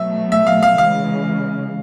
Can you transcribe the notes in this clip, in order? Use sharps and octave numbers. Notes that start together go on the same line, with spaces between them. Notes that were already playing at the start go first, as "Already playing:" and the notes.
Already playing: B2 F#3 A3 E5
E5
F5
F5
C#3 E3 G#3 F5